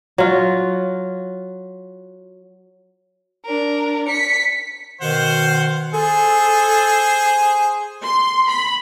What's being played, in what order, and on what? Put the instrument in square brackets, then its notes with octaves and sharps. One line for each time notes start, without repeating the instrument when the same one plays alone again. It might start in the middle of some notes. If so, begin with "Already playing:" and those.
[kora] F#3 F4
[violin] D4 A#4
B6 C#7
[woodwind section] B2 D#3 [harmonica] C5 F5 F#5
[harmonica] G#4 C5 [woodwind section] A4
[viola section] C6
B5